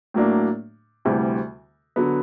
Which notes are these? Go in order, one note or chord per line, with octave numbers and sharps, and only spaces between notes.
A2 F#3 A#3 D4
D2 C3 E3 G3
D3 F#3 B3